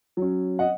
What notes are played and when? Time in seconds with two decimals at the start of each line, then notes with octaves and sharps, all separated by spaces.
0.17 F#3 C#4
0.59 D#5 F#5